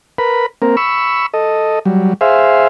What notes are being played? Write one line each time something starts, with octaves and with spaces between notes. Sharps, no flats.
A#4 B4 B5
A#3 C4 A#4
B5 C#6 E6
A4 D#5
F#3 G3
G#4 C5 E5 F5